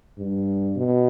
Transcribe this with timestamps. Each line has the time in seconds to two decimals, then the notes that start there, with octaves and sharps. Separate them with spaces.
0.18 G2
0.77 B2